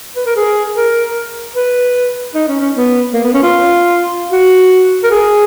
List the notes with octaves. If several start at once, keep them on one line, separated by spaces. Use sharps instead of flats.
B4
A#4
G#4
A#4
B4
D#4
C#4
C#4
B3
A#3
B3
C#4
F4
F#4
A#4
G#4